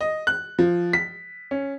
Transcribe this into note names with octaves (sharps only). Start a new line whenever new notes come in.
D#5
F#6
F3
B6
C#4